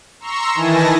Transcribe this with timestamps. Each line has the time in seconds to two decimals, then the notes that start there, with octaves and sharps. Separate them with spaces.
0.20 A#5 C6 C#6 E6
0.54 D#3 E3 E4 G#5 A5 A#6